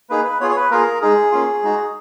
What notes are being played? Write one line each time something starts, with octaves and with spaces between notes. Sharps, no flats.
A#3 D#4 G#4 B4
B4
B3 F4 G#4 C#5
C#5
B4
A#3 F4 G#4 A#4
G#3 D#4 G#4
A#3 C#4 F4
G#3 D#4 F#4